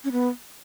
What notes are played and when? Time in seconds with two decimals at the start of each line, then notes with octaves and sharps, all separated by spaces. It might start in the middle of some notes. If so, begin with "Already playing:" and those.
0.04 C#4
0.12 B3